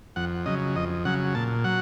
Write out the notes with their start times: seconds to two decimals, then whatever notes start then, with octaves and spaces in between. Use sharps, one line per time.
0.16 F2 F#5
0.46 C#3 F#3 D#5
0.76 F2 D#5
1.05 C#3 F#3 F#5
1.35 A#2 A5
1.64 F#3 F#5